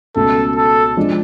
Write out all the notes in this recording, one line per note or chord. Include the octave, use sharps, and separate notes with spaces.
C#2 B2 A3 A4
A4
F3 G#3 D4